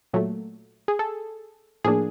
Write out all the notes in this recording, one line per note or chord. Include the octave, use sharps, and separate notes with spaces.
A#2 F#3 A3
G#4
A4
A2 F3 A#3 D4 G#4